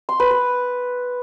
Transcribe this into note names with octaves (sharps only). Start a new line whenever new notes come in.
C6
B4
B4